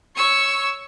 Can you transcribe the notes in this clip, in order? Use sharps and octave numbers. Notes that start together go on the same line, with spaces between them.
C#5 C#6 E6